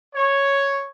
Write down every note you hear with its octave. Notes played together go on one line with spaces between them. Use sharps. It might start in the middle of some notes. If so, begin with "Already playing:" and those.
C#5